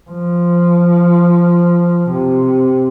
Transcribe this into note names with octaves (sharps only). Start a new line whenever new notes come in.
F3
C3